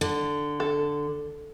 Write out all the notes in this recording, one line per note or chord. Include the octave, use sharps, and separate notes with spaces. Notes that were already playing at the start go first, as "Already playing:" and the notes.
D3
A4